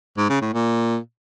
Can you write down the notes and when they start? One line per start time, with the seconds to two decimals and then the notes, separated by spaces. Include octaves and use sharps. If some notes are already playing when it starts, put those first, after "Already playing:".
0.18 G#2
0.30 C#3
0.42 A2
0.54 A#2